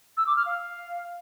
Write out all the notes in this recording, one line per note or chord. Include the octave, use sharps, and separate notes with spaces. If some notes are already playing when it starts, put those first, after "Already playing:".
E6
D6
F6
F5